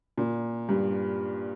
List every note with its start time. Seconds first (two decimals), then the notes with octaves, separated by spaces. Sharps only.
0.18 A#2
0.69 G2